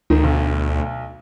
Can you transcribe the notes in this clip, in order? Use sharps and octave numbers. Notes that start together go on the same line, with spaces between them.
D2 D#3
B1